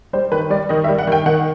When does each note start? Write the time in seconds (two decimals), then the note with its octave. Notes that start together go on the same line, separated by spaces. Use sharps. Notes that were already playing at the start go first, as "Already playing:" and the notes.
0.13 G3 C5
0.32 D#3 B4
0.50 G3 D5
0.69 D#3 D#5
0.84 E5
0.88 G3
0.98 F#5
1.07 D#3 G5
1.26 D#3 F#5